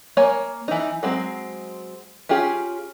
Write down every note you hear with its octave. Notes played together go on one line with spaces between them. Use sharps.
A#3 C#5 G#5
E3 D#4
F#3 G#3 C4
C#4 F4 G4 G#4